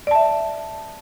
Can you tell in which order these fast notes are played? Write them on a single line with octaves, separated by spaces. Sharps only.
D5 A5 E5